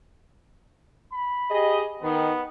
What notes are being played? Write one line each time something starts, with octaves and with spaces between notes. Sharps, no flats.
B5
G4 G#4 D#5
D#3 B3